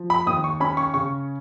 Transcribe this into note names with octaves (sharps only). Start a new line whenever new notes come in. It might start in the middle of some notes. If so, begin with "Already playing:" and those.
Already playing: F3
B5
D#2 D#6
C#6
C#4 B5
C#6
C#3 C#6